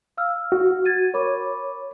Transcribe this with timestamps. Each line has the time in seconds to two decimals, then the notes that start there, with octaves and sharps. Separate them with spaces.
0.17 F5 E6 F6
0.52 F#4
0.85 G#6 A6 D#7
1.14 A#4 C#5 B5 D6